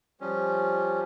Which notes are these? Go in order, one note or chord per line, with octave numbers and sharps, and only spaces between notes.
F3 G3 C#4